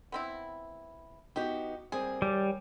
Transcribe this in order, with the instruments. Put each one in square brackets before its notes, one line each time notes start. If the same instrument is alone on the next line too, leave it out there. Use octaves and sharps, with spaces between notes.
[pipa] B3 C4 E4
[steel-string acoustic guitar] B3 D#4 F#4 [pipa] G4
[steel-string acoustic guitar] G3 A#3 C4 [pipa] G#4
[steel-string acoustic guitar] D#2 [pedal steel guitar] G3